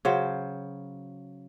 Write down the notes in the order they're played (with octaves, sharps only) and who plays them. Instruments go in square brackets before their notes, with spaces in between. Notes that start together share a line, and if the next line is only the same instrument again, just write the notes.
[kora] C#3 F#3 C5